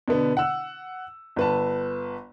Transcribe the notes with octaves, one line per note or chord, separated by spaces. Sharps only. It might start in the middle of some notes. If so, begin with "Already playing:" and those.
B2 D3 B3
F#5 E6
G1 B4 A5